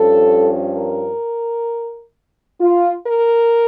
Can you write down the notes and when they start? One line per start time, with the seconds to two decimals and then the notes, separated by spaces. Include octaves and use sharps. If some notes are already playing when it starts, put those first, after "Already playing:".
Already playing: G2 F3 C#4 A4
0.76 A#4
2.61 F4
3.07 A#4